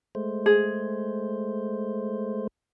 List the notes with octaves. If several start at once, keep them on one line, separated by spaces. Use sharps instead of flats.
G#3 A3 C5
G#4